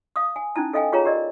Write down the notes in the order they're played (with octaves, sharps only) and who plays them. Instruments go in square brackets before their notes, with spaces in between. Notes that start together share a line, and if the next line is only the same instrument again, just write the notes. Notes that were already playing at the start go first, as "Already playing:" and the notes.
[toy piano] F5 D#6
G#5
C#4 D#4 E4 A5
A4 D#5 F5 G5 G#5
F4 G#4 C#5 F5 A#5
G4 A#4 D5 D#5